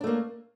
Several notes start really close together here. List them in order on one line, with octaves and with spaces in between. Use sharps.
D4 A3 A#3